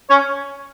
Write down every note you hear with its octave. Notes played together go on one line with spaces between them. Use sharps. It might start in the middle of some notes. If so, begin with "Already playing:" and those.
C#4 C#5